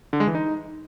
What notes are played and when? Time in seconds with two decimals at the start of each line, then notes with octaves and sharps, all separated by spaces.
0.13 D3
0.20 G#3
0.27 E3
0.35 D#4